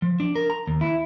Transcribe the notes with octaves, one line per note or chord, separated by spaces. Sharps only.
F3
D4
A#4
A#5
D#2
E4